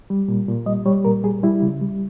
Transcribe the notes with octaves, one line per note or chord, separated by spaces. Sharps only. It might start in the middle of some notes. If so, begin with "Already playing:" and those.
G3
A#2
A#2
G3 D#5
G3 C#5
A#2 A#4
G3 G#4
G3 E4
C#3
G3